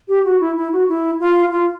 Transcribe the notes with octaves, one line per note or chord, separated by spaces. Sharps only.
G4
F#4
E4
E4
F#4
E4
F4
F4